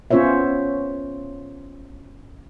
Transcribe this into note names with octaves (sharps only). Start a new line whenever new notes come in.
B3 C#4 F4 C5 C#5 E5